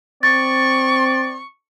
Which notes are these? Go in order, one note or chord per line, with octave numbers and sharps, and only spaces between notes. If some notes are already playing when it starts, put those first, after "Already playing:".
C4 D5 C#6 A6